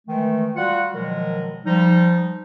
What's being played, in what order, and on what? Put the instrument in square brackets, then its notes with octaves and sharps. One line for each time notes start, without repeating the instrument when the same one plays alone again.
[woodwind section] D#3 E3 G#3 A3
G3 F4 F#4 F#5
B2 D#3 F3 F#3 G#3 A#4
F3 G3 D#4